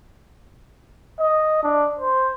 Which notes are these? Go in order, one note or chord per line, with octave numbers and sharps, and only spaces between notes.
D#5
D4
C5